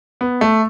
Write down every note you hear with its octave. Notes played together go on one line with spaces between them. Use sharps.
B3
A3